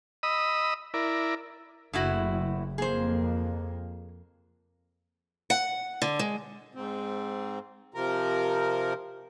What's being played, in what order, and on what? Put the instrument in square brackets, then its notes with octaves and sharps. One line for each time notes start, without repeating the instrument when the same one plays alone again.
[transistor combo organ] D#5 B5 D#6 E6
E4 A#4 D5
[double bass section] F#1 [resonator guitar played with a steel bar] A2 E4 F#4
[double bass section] F2 A#3 [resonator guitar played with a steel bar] G#4 C5
[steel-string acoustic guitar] F#5
D3
G#3
[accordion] G#2 C4
C3 F3 A#4